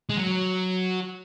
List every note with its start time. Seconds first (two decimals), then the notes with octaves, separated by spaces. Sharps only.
0.09 G#3
0.17 F#3